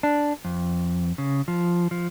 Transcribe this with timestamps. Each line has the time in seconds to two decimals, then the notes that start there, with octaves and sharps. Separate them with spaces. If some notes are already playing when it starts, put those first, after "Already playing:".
0.03 D4
0.45 F2
1.18 C#3
1.48 F3
1.91 F3